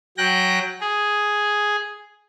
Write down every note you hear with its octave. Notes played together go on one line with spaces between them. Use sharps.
F#3 G5 F#6 A#6
G#4